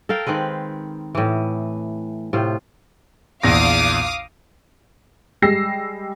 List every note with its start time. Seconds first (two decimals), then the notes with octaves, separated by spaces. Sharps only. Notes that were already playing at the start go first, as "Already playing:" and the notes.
0.09 A4 A#4 F5 G5
0.27 D#3 G#3 C4 B4
1.15 A2 E3
2.33 A2 C3 F4
3.43 A#1 E2 F5 D6 D#6 A#6
5.42 G3 G#3 G4 E6 A#6 C7